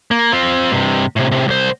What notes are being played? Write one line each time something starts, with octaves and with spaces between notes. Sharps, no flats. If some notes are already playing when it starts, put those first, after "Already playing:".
A#3
C4 F4
G2 C3
A2 C3
A2 C3
C2 C5